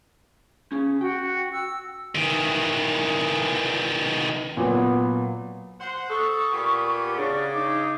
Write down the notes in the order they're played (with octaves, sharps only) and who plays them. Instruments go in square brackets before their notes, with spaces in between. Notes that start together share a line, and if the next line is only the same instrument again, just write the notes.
[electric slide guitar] C#4 G#4
[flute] F#4 [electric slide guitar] G5
[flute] E6
[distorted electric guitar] D#3 E3
[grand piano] A#2 F#3 [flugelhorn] B3
[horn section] C5 F#5
[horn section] A4 [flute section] C#6 D#6
[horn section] A#2 B3 G4
[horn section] C#3 [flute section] D4 D5 C#6
[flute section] D#4 D6